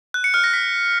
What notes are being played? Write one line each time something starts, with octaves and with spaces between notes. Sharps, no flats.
F#6
C#7
F6
A#6
B6